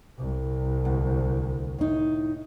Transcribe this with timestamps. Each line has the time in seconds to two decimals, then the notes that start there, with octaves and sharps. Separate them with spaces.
0.19 C2
0.85 D2
1.78 A2 D#4